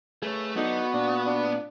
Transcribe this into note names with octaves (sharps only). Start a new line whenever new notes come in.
A3 G#4 B4 C#5
F#3 B3 D#4 F#4 A4 D5
A#2 D4
D4